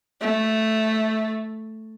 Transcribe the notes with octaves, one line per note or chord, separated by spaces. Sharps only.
A3